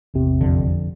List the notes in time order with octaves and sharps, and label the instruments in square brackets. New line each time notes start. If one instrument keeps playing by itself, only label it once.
[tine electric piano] A1 E2 C3
[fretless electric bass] F2 D3